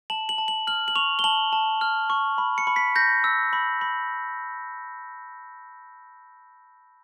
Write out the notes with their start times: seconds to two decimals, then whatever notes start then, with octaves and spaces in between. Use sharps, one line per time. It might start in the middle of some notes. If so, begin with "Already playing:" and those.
0.10 A5 F#7
0.29 F#7
0.38 A5
0.48 F#7
0.67 F6 F#7
0.88 F#7
0.96 C#6 F7
1.19 G7
1.24 A5 F#7
1.53 A5
1.81 F6
2.10 C#6
2.38 B5
2.58 C#7
2.67 B5
2.76 B6
2.96 G6 A#6
3.24 E6
3.53 B5
3.81 B5